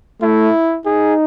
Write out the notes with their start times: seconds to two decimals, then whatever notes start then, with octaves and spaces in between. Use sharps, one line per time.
0.22 A3 E4
0.86 D#4 G#4